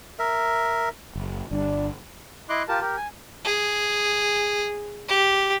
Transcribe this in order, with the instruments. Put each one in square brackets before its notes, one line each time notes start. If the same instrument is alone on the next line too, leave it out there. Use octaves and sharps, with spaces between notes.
[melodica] A#4 E5
[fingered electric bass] F#1
[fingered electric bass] G1 [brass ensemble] G3 D4
[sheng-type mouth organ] E4 D#5 C6 D6 F#6
F4 G4 A#4 A5
G4 A#4
G#5
[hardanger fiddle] G#4
G4